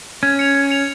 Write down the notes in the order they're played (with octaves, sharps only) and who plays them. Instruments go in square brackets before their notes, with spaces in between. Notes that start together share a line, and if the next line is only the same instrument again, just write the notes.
[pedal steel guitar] C#4 [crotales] G#6
[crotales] C#7 F7
G#6
C#7 F7